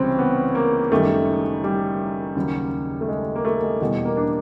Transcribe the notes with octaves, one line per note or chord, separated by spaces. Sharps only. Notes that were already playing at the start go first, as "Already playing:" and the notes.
Already playing: C#2 C3 E3 G3 C4 C#4
B3
A#3
F#1 F#2 D#3 G3 A3
G3
D#2 C#3 F#3
A3
G#3
A#3
A3
G#3
E2 B2 G3
A#3
D4